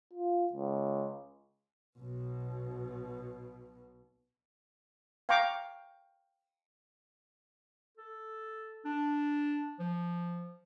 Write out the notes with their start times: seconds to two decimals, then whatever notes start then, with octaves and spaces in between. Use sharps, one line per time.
0.13 F4
0.53 C#2
1.98 B1 B2
5.29 F5 G5 A#5 C#6 D6
7.97 A4
8.85 D4
9.79 F3